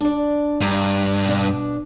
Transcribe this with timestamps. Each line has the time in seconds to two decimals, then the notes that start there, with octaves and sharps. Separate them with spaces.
0.01 D4 D5
0.61 G2 A#5
1.26 B2 D4